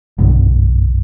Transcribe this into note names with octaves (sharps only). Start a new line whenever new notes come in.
F#1 B1 G2 D3